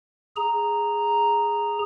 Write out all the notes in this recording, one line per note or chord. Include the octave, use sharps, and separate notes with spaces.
G#4 A#5